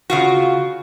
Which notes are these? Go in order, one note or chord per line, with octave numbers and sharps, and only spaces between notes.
C#3 F4 F#4